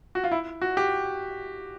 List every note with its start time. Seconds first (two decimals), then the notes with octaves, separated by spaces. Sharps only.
0.15 F#4
0.24 F4
0.31 E4
0.62 F#4
0.77 G4